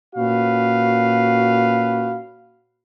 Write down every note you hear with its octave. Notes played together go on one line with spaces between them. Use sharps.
A#2 C#4 F#4 B4 F5